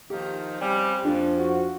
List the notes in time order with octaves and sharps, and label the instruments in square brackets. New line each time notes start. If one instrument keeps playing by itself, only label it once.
[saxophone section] D#3 F3 D#4 [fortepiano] G4
[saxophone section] C#3 G3 [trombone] C4
[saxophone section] F2 [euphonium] F3 [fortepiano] D4
[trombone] F#4